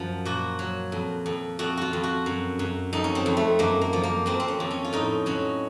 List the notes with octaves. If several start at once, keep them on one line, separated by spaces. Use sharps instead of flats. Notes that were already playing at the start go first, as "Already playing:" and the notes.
Already playing: F#2 F3
A#2 F#4
F#3
F2
F2
F2 F#4
F4 F#4
F2
F#4
F#2
F#2
F2 D#4
C#4
C4
F2
A3
F#2 A#3
A#3
F3
A#3
F2 C4
C4
C#4
F2
C#4
F4
A2 D#4
F#3 C#4